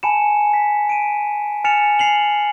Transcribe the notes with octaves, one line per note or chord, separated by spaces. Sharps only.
G#5 A5 B5 C#7 E7
B6
D7 D#7
G#5 F6 A6 C#7 E7 F7
C7 F7 F#7